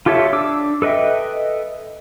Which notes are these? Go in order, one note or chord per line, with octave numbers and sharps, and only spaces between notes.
F4 G4 A4 C#5 E5
D4 D6 E6
A4 B4 D#5 E5 G5